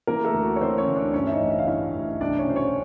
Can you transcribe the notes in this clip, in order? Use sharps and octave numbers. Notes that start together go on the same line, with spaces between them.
E3 A#3 A#4
A3 A4
D2
F#4
C#5
E3 C4 C5
C#4 C#5
D2
D4 D5
G2 C#4 C#5
E5
D#4 D#5
A1
E5
F5
G2 E4 E5
A1
C2 D4 D5
C#4 C#5
B2 C5
C#4 C#5